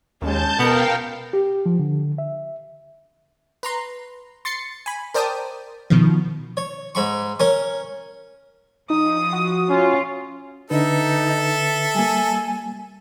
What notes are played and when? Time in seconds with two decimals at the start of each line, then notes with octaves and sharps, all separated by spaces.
0.22 D#2 G#3 C#4 A5 G6
0.59 B2 B3 A#4 F5 G5
1.33 G4
1.66 F3
1.79 D3
2.18 E5
3.63 B4 A#5 C6
4.45 C6 A6 C7 C#7
4.86 G#5 B5
5.14 A#4 C5 D5 G5 A5 D#6
5.90 B2 D#3 F3
6.57 C#5
6.95 G#2 B5 C#6
7.40 C#4 A#4 C#5
8.90 F3 D#4 D#6
9.33 F#4
9.69 C#4 F4
10.70 D3 D#4 A4 B4 E5
11.95 G3 A#3 G#5